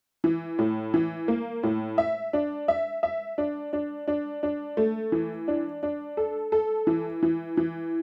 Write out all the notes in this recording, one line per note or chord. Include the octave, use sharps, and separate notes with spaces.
E3
A2
E3
A#3
A2
E5
D4
E5
E5
D4
D4
D4
D4
A3
E3
D4
D4
A4
A4
E3
E3
E3